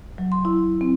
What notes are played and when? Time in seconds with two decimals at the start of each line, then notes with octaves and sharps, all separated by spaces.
0.18 F#3
0.32 C6
0.45 E4
0.81 C4